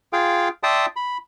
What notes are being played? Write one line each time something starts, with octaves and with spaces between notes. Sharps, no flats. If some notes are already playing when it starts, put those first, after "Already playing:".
F4 G#4 F5 G5
D5 E5 G5 A5 C6 D#6
B5